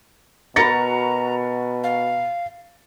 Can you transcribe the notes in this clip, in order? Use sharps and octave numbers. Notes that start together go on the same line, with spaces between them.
B2 F#4 A#4 A#5 B5 A6 A#6 C#7
F5